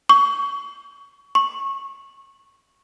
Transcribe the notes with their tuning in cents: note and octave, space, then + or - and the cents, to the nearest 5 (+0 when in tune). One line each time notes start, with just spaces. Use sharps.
C#6 +25
C#6 -20